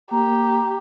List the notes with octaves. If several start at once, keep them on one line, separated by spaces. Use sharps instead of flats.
A#3 G4 A#5